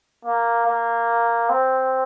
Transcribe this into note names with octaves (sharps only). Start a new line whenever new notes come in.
A#3
A#3
C4